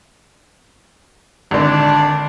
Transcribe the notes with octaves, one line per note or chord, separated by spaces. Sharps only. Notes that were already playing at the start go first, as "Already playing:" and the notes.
G#1 D3 D4